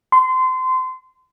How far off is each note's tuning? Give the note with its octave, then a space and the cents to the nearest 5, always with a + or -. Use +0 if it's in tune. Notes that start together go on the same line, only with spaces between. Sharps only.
C6 -25